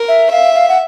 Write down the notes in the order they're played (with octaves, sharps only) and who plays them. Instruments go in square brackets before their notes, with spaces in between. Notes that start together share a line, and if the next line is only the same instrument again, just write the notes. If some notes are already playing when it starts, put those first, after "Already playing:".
Already playing: [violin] A#4
[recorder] E5
[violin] E5 [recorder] F5
[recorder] F5
F#5